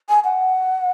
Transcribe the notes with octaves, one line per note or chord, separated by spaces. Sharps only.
G#5
F#5